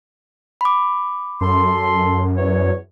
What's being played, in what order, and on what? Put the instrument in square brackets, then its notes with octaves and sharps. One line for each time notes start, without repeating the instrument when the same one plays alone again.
[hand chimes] B5 D6
[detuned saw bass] F#2 [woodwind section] A4 A5 C6
[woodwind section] E2 C#5